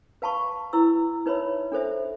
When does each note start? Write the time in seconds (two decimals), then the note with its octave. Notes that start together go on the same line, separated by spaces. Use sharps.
0.22 B4 F5 A5 B5 C#6
0.73 E4 B4 E6
1.26 D#4 B4 C#5 E5 B5
1.72 D4 A4 C5 E5